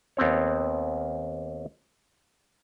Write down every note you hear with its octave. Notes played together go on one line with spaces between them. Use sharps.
D#2 B3 C4 C#5